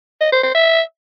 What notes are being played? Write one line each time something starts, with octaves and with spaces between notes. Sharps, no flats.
D#5
C5
C5
E5